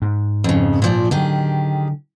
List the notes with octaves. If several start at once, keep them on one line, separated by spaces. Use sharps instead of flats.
G#2
F2 C#3
A#2 F3 D5
D3 D#3 F#3 G4 G#4